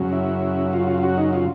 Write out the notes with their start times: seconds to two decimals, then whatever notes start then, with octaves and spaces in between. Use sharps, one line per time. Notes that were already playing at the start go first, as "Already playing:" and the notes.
Already playing: F#2 C#3 F#3
0.13 E4
0.73 F4
0.88 F4
0.98 F4
1.03 F#4
1.17 D#4
1.33 F4